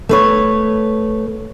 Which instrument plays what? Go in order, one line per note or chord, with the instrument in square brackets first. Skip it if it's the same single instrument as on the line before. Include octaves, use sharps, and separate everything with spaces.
[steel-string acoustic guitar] A3 B4 C#5